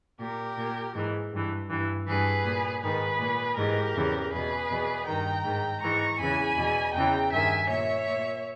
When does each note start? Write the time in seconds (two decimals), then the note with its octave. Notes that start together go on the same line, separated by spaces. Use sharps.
0.20 A#2 G4 A#4
0.58 A#2
0.96 G#2 E3
1.33 G2 E3
1.71 G2 E3
2.07 G2 E3 G#4 B4
2.45 A#2
2.83 G#2 D#3 G#4 B4
3.20 A#2
3.57 G#2 E3 G4 A#4
3.96 E2 C#3 E3
4.32 E2 B2 G#4 B4
4.70 E2 B2
5.07 G2 D#3 G5 A#5
5.44 G#2 D#3
5.82 G#2 E3 A#5 C#6
6.20 E2 C#3 E3 G#5 B5
6.57 E2 B2
6.94 E2 C#3 E3 G5 A#5
7.32 G2 D#3 E5 G#5
7.69 A#2 C#5 E5
8.08 A#2